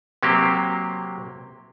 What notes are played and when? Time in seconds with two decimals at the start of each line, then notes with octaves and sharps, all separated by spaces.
0.23 C3 F#3 A#3 C4 G4